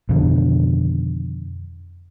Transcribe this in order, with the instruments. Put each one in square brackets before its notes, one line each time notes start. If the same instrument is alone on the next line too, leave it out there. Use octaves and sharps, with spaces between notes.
[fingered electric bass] F2 B2 D3 D#3